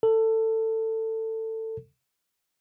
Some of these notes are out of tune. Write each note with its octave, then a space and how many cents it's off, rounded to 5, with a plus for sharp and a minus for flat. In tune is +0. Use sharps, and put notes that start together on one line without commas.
A4 +20